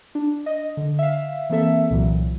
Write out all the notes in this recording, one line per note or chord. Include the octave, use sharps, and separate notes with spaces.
D4
D#5
D3
E5 F5
E3 A#3 C4 A4 E5
C2 A#2 E3 F#3